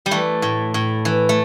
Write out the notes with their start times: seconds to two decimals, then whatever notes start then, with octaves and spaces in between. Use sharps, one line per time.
0.06 G3
0.11 E3 A3
0.42 A2
0.74 A2
1.05 E3
1.29 A3